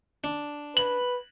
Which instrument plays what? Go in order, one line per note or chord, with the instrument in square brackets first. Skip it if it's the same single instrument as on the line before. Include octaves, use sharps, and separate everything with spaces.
[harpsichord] D4
[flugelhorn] B4 [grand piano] F#7